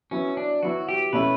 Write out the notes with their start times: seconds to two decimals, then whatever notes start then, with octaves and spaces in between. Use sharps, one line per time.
0.11 F#3 B3 C#4 E4
0.37 D4
0.63 F#3 B3 E4 F#4
0.89 G4
1.13 B2 A3 C#4 E4 B4